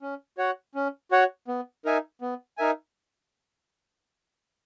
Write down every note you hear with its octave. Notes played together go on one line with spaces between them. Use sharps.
C#4
F#4 C#5 F#5
C#4
F#4 C#5 F#5
B3
D#4 A#4 E5 G#5
B3
D#4 A#4 E5 G#5